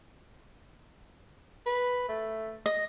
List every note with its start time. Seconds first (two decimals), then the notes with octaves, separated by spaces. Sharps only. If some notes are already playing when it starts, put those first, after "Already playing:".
1.66 B4
2.09 A3
2.66 D#5